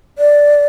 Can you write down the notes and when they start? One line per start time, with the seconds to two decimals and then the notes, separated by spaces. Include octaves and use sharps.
0.18 D5